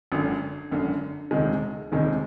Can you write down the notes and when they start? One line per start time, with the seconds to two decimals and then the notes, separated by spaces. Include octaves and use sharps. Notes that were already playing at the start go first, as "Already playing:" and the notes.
0.12 G#1 F#2 D3
0.71 G#1 F#2 D3
1.31 E1 D2 C3 D#3 G#3
1.92 E1 D2 C3 D#3 G#3